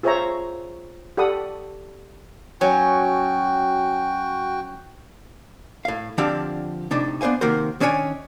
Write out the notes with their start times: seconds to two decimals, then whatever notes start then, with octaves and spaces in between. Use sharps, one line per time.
0.03 F4 G#4 C5 C#5 E5 A#5
1.17 G4 A4 D5 F#5 B5 D#6
2.61 F#3 C#4 F#4 G5
5.85 A2 F5
6.18 D3 F3 C4 D4 G4 F5
6.91 A2 C3 D4 D#4
7.21 B3 D4 C5 F5 G#5
7.41 C3 D#3 A#3 F#4 C5
7.80 D#3 C#4 D4 C#5 G#5